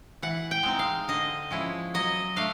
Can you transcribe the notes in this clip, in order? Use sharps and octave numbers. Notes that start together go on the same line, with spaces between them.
E3 F#5
G5
G#3 C4 D#4
F5
D3 D#5
F3 G#3 C#4 E4
F#3 D#5
A3 D4 F5